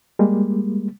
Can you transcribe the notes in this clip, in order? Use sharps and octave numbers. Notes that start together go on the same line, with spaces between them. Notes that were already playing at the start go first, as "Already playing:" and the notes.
G3 G#3 A#3